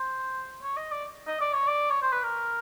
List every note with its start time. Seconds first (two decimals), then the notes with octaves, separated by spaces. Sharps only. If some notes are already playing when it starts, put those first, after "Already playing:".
Already playing: C5
0.63 C#5
0.77 D#5
0.91 D5
1.27 D#5
1.41 D5
1.54 C#5
1.67 D5
1.91 C#5
2.02 C5
2.12 B4
2.23 A#4